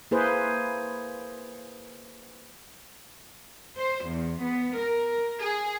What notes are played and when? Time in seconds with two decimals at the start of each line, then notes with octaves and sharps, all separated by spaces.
0.11 A#3 E4 G#4 B4 C5
3.77 C5
4.09 E2
4.43 B3
4.79 A#4
5.41 G#4